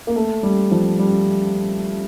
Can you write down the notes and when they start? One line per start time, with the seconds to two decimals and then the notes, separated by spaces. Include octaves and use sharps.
0.07 A#3
0.16 A3
0.43 G3
0.71 F3
0.99 G3